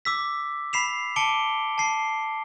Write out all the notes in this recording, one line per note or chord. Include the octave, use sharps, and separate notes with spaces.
D6 E6 B6
B5 B6 C7 E7 F7
A5 D6 C#7 D7 G7
A5 C7